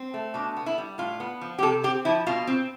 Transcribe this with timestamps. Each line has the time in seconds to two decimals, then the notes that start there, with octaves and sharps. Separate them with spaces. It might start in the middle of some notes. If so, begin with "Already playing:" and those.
Already playing: C4
0.14 A3
0.34 B2 D4
0.56 B3
0.66 E4
0.78 G3
0.98 A2 F4
1.20 B3
1.41 F3
1.59 G4
1.62 C3 A4
1.83 C4 G4
2.05 F3 E4
2.27 B2 F4
2.47 C4